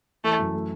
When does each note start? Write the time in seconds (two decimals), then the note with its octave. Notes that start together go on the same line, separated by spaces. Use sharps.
0.24 E3 A3
0.39 F#2
0.54 A3